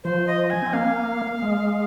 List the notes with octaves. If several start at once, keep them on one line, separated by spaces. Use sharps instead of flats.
F3 C5
D#5
G#5
C4
A#3 F5
G#3